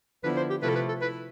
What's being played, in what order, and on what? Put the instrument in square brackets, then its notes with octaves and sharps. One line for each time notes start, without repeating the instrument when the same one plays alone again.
[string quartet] D3 F3 B3 E4 [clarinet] B4
[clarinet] C5
G4
[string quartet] C3 F3 A3 E4 [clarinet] B4
[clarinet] A4
B4
A4
[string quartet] E4 [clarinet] B4